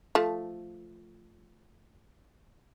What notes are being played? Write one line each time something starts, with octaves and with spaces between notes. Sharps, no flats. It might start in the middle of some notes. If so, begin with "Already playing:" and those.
F3 A3